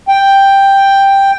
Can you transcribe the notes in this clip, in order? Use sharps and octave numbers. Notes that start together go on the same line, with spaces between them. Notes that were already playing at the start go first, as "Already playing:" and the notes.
G5